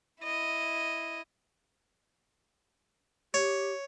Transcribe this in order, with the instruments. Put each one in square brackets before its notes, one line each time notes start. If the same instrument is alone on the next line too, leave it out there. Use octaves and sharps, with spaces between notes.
[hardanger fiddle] E4 D#5
[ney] G4 [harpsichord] C#5